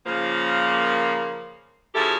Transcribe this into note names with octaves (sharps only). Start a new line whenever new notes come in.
C#3 F3 A#3
C#3 F3 E4 F#4 G4 A4